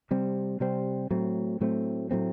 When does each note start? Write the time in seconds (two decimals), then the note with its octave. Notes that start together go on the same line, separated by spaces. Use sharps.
0.11 C3 G3 C4
0.60 C3 G3 C4
1.11 A2 F#3 A3 C4
1.61 A2 F#3 A3 C4
2.11 A2 F#3 A3 C4